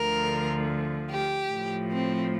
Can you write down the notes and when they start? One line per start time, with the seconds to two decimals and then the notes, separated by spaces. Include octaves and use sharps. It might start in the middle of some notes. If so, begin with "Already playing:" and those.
Already playing: D2 D3 F3 A#4
1.10 G4
1.51 A2 F3
1.91 C4